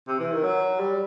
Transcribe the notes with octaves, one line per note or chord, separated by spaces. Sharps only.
C3
E3
D#3
F#3
G3